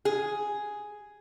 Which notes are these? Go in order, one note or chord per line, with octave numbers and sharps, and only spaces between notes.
G#4